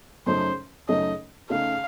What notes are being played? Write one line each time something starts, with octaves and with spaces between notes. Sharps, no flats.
F#2 C#3 A3 D#4 C5
F#2 C#3 A3 D#4 D#5
C#3 A3 D#4 F5